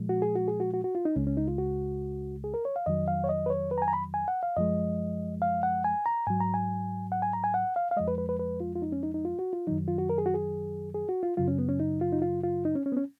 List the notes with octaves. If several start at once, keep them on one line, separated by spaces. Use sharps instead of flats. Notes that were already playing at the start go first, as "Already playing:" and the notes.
Already playing: A#2 F3 G#3
F#4
G#4
F#4
G#4
F#4
F#4
F#4
F4
D#4
C#2 C#3 G#3 C#4
C#4
D#4
F4
F#4
G#4
A#4
C#5
F5
F2 D#3 F#3 D#5
F5
C#5
D#5
B4
C#5
B4
A#5
G#5
A#5
B5
G#5
F#5
F5
F#2 F3 G#3 D#5
F5
F#5
G#5
A#5
G#2 F#3 G#5
A#5
G#5
F#5
G#5
A#5
G#5
F#5
F5
F5
F2 F3 G#3 D#5
B4
B4
B4
B4
F4
F4
D#4
C#4
D#4
D#4
F4
F#4
F4
F#2 D#3 F#3 D#4
F4
F#4
A#4
G#4
F#4
G#4
G#4
F#4
F4
F#2 C#3 F#3 F4
C#4
B3
C#4
D#4
F4
D#4
F4
F4
D#4
C#4
C#4
B3
C#4